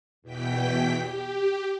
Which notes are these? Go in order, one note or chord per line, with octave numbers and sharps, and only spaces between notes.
E2 B2 E3 G5 B6
G4